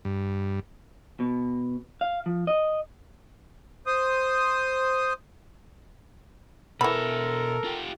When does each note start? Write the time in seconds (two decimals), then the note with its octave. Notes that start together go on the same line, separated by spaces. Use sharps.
0.05 G2
1.20 B2
2.01 F5
2.26 F3
2.47 D#5
3.87 C5 D#6
6.81 B2 E3 A4 A#4 E5 B5
7.65 F4 G4